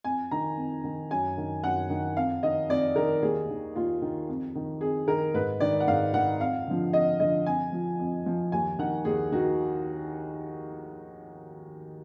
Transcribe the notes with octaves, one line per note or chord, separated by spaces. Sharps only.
F2 G#5
D#3 A#5
F2
D#3
F#2 G#5
D#3
F#2 F#5
D#3
F2 F5
D#3 D#5
F2 D5
D#3 A#4
D#2 G#4
D#3
D#2 F4
D#3
F2
D#3
F2 G#4
D#3 A#4
G#2 B4
D#3 D5
F#5
G#2 F5
D#3 F#5
F2 F5
D3 F3
F2 D#5
D3 F3 D#5
F2 G#5
F3
F2
F3
D#2 G#5
D#3 F#5
D#2 G#4
D#3 F#4